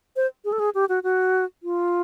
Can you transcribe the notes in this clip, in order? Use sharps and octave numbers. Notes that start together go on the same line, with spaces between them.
C5
G#4
A4
G#4
G4
F#4
F#4
F4